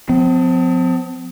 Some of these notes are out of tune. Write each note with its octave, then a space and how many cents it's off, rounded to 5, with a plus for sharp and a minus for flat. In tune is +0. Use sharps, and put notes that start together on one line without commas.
F3 +30 C4 -45